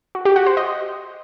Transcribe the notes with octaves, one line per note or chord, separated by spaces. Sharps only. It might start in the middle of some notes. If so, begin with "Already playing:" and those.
F#4
G4
F#4
C5
D#5